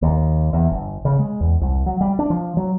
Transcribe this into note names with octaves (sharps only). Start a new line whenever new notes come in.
D#2
E2
G1
C#3
G#3
E2
C2
F#3
G3
D4
F3
F#3